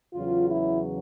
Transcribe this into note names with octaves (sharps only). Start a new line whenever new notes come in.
E2 C#3 F#3 F4
E4